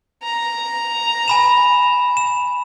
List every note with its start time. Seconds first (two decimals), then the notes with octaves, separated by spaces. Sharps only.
0.23 A#5
1.28 G#5 B5 E7
2.17 E7